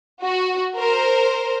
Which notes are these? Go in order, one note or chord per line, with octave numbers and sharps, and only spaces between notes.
F#4
A#4 C5